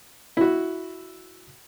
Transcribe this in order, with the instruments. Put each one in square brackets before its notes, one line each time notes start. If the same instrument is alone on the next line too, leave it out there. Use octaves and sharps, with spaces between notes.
[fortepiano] E4 F#4